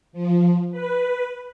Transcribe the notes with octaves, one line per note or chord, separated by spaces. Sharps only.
F3
B4